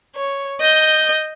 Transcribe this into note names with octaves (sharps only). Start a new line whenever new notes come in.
C#5
D#5 G6